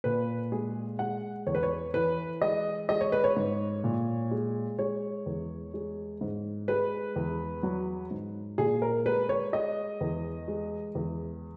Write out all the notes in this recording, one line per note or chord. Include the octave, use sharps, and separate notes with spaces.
A#2 B4
G#3 G#4
G#3 F#5
E2 C#5
B4
C#5
E3 B4
G#3 D#5
G#3 D#5
C#5
B4
C#5
G#2
A#2
G#3
G#3 C#5
E2
G#3
G#2
G#3 B4
E2
F#3
G#2
A#2 G#4
A#4
G#3 B4
C#5
G#3 D#5
E2
G#3
E2